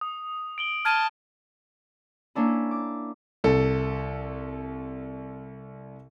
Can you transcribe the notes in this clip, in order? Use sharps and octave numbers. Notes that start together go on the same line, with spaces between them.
D#6
D7 F#7 G7
A5 F6 G#6 D#7
A#3 C#4 D4 E4
D6
C2 A4